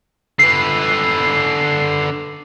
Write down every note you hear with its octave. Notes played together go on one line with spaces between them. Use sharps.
D3 B4 C7